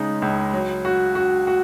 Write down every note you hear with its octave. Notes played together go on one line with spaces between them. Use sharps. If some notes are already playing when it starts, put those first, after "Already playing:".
Already playing: C#3 G#3 D#4
C#2
F#3
F#4
F#4
F#4